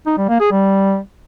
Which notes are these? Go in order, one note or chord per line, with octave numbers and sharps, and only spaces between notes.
D#4
G3
A#3
G#4
G3